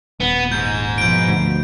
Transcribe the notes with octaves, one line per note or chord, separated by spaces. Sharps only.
D#1 B3
G#2 G6
B2 F3 G6 D7
D2